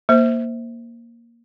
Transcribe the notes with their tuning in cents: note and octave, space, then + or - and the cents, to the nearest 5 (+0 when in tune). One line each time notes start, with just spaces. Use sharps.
A#3 +0 C5 +0